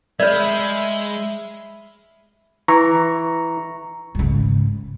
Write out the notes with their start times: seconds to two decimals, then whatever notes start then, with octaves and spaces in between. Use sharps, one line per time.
0.20 G#3 C#5 D5 E5 B5 F6
2.68 E3 A#5 C#6
4.15 G#2 C#3